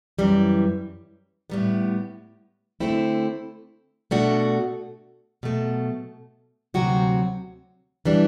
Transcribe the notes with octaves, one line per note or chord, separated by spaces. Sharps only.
F#2 E3 G3
A2 G3 B3
D3 A3 C4 E4
B2 A3 D4 F#4
B2 F#3 A3
D2 C3 F#3 C4 F#4
E3 G3 D4